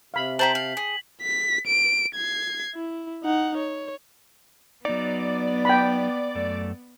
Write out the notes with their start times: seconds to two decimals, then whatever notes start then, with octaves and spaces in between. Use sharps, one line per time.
0.14 C3 F5 B5
0.39 C5 G5 A5 A#5 C6 B6 F#7
0.55 F5
0.77 G#4
1.22 B6
1.67 D7
2.15 G#6 C7
2.75 E4
3.23 D#4 F#5
3.57 C#5
4.85 F#3 B3 D#4 D5
5.65 G5 B5
6.35 F#2 A3